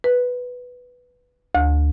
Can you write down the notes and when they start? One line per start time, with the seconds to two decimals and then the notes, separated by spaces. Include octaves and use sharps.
0.04 B4
1.55 D2